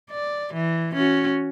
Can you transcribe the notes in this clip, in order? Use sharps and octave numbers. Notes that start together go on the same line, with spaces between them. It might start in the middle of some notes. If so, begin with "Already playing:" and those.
D5
E3
C#4 F#4